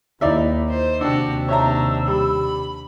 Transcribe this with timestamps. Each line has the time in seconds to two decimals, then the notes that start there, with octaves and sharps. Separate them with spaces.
0.21 D#2 D#4 E4 D5 E5
0.69 C5
1.01 D#2 C3 D4 F#4 G4 E6
1.48 D4 D#4 C#5 E5 A#5
2.08 G3 B5